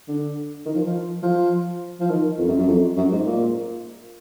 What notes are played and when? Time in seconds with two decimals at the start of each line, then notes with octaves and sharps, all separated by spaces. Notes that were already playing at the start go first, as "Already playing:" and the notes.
0.08 D3
0.66 D#3
0.75 F3
0.85 F3
1.23 F3
2.00 F3
2.09 D#3
2.38 F2
2.48 F#2
2.58 F#2
2.68 F2
2.97 F#2
3.12 G#2
3.25 A#2